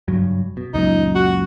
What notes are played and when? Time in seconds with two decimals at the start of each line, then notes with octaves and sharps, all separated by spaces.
0.08 F#1 G2 F#3
0.57 B2
0.74 C#2 F#2 A#2 D#4
1.15 F#4